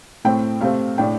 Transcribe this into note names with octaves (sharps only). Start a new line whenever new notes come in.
A2 A3 C4 G5
C3 A3 C4 F5
A2 A3 D4 G5